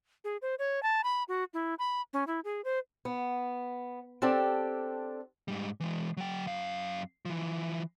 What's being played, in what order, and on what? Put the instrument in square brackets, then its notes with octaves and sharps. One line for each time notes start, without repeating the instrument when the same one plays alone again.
[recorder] G#4
C5
C#5
A5
B5
F#4
E4
B5
C#4
E4
G#4
C5
[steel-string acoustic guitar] B3
C4 D4 G4 A4
[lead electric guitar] G#2 G3
E3 G#3
F#3 G5
F#2 F5
E3 F3